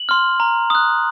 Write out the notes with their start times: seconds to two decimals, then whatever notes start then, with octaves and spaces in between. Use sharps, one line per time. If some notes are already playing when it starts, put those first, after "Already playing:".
Already playing: F#7
0.09 C6 F6
0.40 A#5
0.70 D#6 F#6